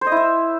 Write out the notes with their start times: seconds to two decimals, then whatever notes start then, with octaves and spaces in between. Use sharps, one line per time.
0.01 C5
0.07 D#5
0.12 E4
0.17 E5